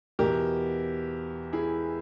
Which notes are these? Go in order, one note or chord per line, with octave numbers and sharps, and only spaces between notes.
E2 B2 G4 A#4
E4 G#4